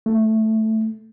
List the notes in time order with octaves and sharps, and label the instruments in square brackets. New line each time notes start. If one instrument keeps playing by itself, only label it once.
[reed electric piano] A3